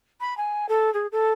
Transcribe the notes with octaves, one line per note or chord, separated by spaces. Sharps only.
B5
G#5
A4
G#4
A4